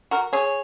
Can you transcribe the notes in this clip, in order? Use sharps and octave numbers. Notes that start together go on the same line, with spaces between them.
F#4 A#4
G#4 C#5